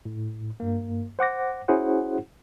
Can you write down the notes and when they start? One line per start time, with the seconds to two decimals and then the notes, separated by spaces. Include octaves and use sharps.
0.05 A2
0.60 G2 A#3
1.19 C5 F#5 D6 A#6
1.68 C#4 E4 F#4 G#4 C5 F#5